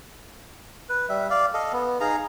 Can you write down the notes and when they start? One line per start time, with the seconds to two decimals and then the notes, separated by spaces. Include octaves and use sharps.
0.89 B4
1.09 G3 E5
1.30 D5 F5
1.54 A4 D#5 F5
1.73 B3
2.00 D#4 G#4 F5 A#5